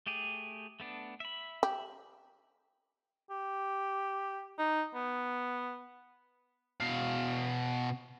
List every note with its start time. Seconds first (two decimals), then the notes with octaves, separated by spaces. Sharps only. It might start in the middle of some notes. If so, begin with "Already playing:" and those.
0.06 A3 G4 G#4
0.80 A3 B3 D4
1.20 E5 B5
1.63 G4
3.30 G4
4.58 D#4
4.94 B3
6.80 B2 F5